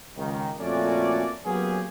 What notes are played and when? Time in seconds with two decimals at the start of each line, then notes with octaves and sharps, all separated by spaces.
0.17 C#2 D#3
0.60 F2 A#2 A3 C#4 F#4 D5
1.45 F#3 A#3 B3 C#4 G4 G#4